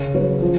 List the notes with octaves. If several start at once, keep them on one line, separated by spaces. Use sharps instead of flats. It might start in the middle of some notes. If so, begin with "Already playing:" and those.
Already playing: C#3
F#3 C#4 F#4 B4
F3